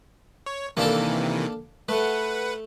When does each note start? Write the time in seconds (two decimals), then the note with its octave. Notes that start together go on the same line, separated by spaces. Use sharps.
0.46 C#5
0.77 C3 D#3 E3 A#3 D4 A4
1.89 A3 B4 F#5